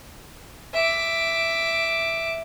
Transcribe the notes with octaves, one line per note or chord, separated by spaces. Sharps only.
E5 D6